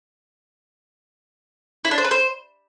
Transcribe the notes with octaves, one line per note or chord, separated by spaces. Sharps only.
E4
D4
C5
B4
C5